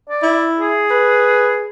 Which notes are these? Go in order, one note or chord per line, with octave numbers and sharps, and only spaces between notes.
D5
E4
G#4
B4